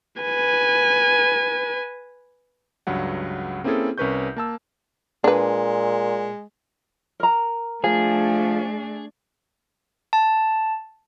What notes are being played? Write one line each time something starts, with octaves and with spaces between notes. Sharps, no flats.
B4 G#5
C#2 G2 F#3 F#5
A#3 C4 C#4 E4 G#4 A4
C2 C#4 A#4 B4 C#6 G6
A#3 A5 E6
A#2 G#3 D4 B4
A#4 A#5
F3 A3 D4 G#4
A5